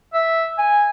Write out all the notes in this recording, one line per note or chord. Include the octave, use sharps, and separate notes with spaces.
E5
G#5